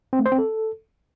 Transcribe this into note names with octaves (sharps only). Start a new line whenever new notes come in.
C4
A3
C5
C4
A4